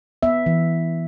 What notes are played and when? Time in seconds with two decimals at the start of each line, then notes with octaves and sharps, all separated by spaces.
0.23 B3 E5
0.46 E3